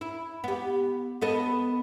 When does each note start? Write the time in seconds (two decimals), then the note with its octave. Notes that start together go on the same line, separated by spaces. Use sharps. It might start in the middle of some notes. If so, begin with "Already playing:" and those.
0.01 E4
0.44 B3 G4
1.22 B3 A4 D#5